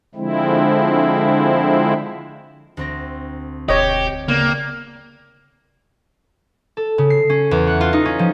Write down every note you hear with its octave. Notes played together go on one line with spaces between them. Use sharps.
D3 F3 G#3 C4 E4
D2 C4 A#6
E1 G4 C#5 D#5
C#3 A#3 B3 D5 G5
A4
C#3
C7
C#4
E2
F#5
F4
D#4
C#4
F3